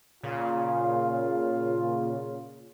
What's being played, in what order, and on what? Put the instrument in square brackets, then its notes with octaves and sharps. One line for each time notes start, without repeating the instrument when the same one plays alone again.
[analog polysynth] A#2 C#3 [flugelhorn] F4